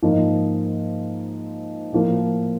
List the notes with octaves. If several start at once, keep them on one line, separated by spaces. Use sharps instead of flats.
G#2 F3 A#3 D#4
A2 F3 A#3